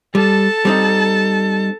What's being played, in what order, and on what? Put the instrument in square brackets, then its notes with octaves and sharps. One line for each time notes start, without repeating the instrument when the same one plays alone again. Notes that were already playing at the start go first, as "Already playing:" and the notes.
[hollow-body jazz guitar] G3 [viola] A4 A5
[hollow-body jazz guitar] G3 C4 D#4